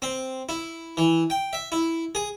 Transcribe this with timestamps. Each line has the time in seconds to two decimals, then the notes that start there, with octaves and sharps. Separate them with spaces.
0.02 C4
0.49 E4
0.97 E3
1.30 G5
1.53 E5
1.72 E4
2.15 G#4